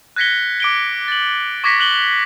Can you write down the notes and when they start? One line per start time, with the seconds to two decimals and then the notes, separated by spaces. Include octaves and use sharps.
0.16 F#6 G#6 A#6 B6 C#7 G7
0.60 D6 D7 G7
1.08 A6 F#7
1.64 C#6 D6 G#6 A#6 B6 C#7
1.79 C#6 F#6 F#7 G7